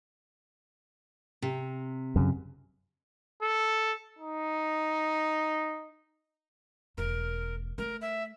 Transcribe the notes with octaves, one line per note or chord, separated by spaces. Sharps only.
C3
F#2 C#3
A4
D#4
E1 A3 A#4
A3 A#4
E5